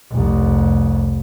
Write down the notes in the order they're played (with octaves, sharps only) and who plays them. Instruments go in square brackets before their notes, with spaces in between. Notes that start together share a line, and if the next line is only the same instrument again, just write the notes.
[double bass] F1 C2